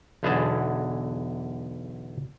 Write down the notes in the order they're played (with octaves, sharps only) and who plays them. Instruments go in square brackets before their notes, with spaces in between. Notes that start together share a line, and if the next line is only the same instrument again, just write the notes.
[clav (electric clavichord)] B1 E2 D3 E3 G#4 A5